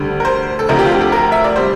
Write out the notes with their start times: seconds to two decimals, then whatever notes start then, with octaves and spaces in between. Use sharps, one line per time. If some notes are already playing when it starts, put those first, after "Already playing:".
Already playing: D2 D3 G3
0.20 A#4
0.25 C5
0.59 A4
0.69 D2 C3 F3 A#4
0.79 G4
0.85 F4
0.91 G4
1.01 A4
1.12 A#4
1.32 E5
1.44 D5
1.56 C3 G3 C5